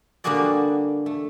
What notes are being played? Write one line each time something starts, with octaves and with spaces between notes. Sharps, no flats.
D3 G3 A#3 F#4 G#4 D5
A3